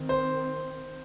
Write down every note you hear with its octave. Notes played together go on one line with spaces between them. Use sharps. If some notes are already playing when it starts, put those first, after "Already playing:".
Already playing: D#3 C4
C5